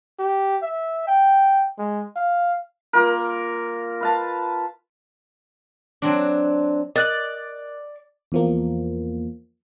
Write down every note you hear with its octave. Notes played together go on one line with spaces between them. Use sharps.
G4
E5
G5
G#3
F5
A#3 F4 A#4
B4 F5 A5
F#3 C4 D4
A#4 D5 D#5 F#6 F#7
E2 F3 A#3